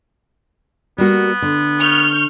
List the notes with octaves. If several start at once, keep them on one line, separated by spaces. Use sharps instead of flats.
G3 A#3 B3 F#4
D3
C#6 F6 G6